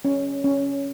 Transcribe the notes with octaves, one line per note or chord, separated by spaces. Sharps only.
C#4
C#4